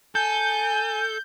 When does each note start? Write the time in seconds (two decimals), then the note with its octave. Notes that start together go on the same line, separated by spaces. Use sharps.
0.15 A4 G#5 G6